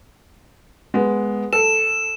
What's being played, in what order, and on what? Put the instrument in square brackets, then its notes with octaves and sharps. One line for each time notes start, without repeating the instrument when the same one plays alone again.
[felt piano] G#3 B3
[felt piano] A4 [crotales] E7